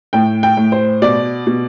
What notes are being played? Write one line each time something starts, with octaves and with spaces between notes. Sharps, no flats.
A2 G5
G5
A2
C5
B2 D5
B2